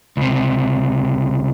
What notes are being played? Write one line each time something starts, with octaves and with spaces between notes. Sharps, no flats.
C#2 C3